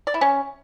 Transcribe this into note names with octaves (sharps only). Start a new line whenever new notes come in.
D5
E4
C#4